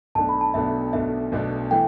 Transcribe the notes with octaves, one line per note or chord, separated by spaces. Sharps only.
B1 B2 A3 D4 A5
B5
A5
B1 B2 A3 D4 E5
B1 B2 A3 D4 E5
B1 B2 A3 D4
E3 A3 G5